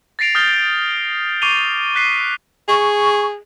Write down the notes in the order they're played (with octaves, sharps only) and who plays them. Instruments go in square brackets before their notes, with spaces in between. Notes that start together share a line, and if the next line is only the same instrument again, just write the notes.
[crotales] A6 A#6 C7 D7 F7
D#6 F6 G6 A6 A#6 G7
C#6 D6 C7 D#7 F7 G7
F#6 B6 C7 D#7
[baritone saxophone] G#4 [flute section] C#6